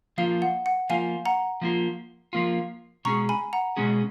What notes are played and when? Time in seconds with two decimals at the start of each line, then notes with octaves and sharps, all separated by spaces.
0.18 F3 A#3 F4 F5
0.42 F#5
0.66 F#5
0.90 F3 A#3 F4 F5 G#5
1.26 F#5 A#5
1.61 F3 A#3 F4
2.33 F3 A#3 F4
3.05 B2 G#3 C#4 G#4 A#5 C#6
3.29 G#5 B5
3.53 F#5 A#5
3.77 B2 G#3 C#4 G#4